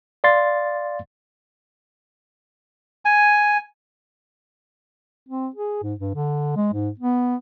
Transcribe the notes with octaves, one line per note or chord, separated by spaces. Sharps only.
D5 F5 C6 A6
G#5
C4
G#4
G#2
G2
D3
G#3
G#2
B3